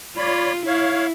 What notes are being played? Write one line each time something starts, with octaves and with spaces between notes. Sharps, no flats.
F4 C#5 D5 B5
E4 C#5 F5